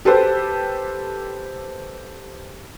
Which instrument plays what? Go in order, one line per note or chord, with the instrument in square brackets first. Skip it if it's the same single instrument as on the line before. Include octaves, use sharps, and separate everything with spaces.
[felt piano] G4 A4 B4 C5